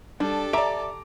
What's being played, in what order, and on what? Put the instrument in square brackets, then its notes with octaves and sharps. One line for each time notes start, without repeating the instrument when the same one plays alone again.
[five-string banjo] G3 [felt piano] D4 [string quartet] G4 A4 A5
[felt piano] D5 D7 [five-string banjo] E5 [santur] A#5 D6